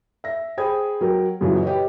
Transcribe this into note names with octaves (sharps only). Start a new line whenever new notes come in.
E5 A#6
G#4 C5 G5 B5 D#6 G#6
F#3 A#4 G5
F#2 A#2 C#3 E3 F#3
G4 B4 C#5 D#5